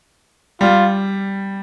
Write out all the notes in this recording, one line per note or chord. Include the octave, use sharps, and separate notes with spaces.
G3 F4